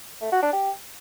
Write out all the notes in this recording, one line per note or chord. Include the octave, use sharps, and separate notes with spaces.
A3
F#4
D4
G4